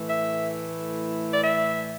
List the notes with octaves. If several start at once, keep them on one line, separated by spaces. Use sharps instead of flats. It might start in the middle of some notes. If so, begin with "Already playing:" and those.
Already playing: A2 E3 A3
E5
D5
E5